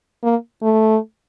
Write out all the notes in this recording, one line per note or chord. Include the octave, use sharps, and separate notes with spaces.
A#3
A3